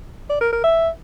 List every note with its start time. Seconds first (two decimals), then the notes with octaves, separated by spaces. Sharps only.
0.30 D5
0.41 A#4
0.52 A#4
0.64 E5